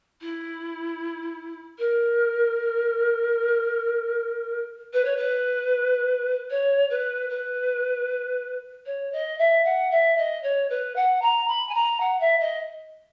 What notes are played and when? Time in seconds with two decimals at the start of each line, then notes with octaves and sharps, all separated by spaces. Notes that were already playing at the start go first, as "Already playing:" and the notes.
0.21 E4
1.78 A#4
4.93 B4
5.04 C#5
5.16 B4
6.50 C#5
6.90 B4
7.29 B4
8.85 C#5
9.12 D#5
9.38 E5
9.64 F#5
9.91 E5
10.17 D#5
10.42 C#5
10.69 B4
10.95 F#5
11.21 A#5
11.48 B5
11.69 G#5
11.74 A#5
12.00 F#5
12.20 E5
12.39 D#5